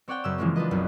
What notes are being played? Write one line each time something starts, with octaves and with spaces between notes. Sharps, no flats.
C4 C#5 D5 F#5 G5
F#2 C#3 E6
C#3 E3 F3 G#3 A#3 C4
D4 F4 B4 D#5
F#1 B1 F#2